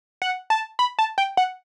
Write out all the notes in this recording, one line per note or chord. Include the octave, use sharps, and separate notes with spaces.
F#5
A5
B5
A5
G5
F#5